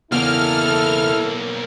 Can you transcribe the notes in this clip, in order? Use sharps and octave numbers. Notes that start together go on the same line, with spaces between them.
B1 E2 C#3 A#3 E4 A4 F6